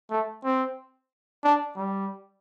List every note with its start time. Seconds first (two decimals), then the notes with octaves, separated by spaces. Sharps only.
0.11 A3
0.44 C4
1.44 D4
1.76 G3